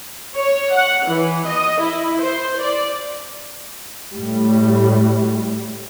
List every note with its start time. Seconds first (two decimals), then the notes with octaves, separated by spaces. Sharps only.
0.35 C#5
0.73 F#5
1.07 E3
1.48 D#5
1.80 E4
2.19 C5
2.61 D5
4.13 A2 G3